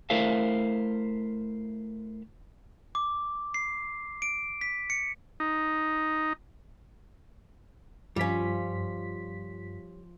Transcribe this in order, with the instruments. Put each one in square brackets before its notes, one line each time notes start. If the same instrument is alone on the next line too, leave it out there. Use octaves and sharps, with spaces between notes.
[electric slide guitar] A3 E4 A#4 C5 E5 F5
[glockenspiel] D6
C7
D7
B6
C#7
[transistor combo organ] D#4
[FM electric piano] G2 B6 [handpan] F3 F4 [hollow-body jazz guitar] G3 C#4